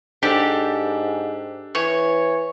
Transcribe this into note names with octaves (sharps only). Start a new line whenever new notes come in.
G#2 D4 G4 A4
E3 C#5